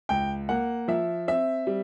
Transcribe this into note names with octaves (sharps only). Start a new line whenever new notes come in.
C#2 G5
A#3 F#5
F3 E5
C4 E5
G3